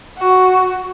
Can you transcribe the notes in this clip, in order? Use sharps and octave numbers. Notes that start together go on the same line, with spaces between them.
F#4